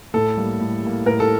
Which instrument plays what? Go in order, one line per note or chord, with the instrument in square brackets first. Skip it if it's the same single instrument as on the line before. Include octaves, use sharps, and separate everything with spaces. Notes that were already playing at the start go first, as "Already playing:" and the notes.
[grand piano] A2 [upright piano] A4
[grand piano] G3 A#3
A2
G3 A#3
[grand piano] A2 [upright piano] A#4
[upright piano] A4